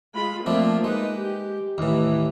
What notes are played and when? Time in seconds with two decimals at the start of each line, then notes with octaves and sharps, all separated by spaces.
0.14 G#3 F4 B5
0.46 F3 A3 A#3 C4 D4 F4
0.84 G#3 D#4 B4
1.18 G4
1.78 D#2 A2 E3